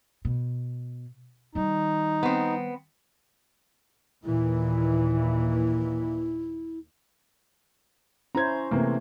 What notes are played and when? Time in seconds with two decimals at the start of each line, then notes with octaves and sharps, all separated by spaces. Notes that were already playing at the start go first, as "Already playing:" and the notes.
0.25 B2
1.55 D#3 G3 D#4
2.23 B3 C4
4.24 D#2 A#2 E3 E4
8.35 C#4 E4 C5 A#5 G#6
8.71 C3 E3 A3 A#3